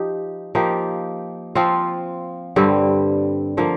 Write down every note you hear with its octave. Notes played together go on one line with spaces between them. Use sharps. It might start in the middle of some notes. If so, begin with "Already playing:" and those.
Already playing: F3 D#4 G4
F3 A#3 D#4 G4
F3 C4 F4
G2 D3 G3 C4
D3 F3 A#3